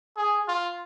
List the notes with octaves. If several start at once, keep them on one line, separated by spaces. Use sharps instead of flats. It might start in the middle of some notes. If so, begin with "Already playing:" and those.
G#4
F4